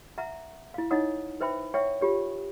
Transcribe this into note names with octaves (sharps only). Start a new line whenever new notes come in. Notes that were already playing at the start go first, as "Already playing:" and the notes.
E5 F#5 A#5
E4 F5
D#4 E4 C#5 D#5 F#5 D#6
B4 C5 E5 G5 B5
C#5 E5 F#5 G5 C#6
F4 G4 C#5